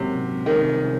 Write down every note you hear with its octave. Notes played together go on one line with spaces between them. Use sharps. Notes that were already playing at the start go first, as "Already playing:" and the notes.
Already playing: G#2 C3 F#3 A#3 C#4
C2 C3 D#3 F3 G#3 C#4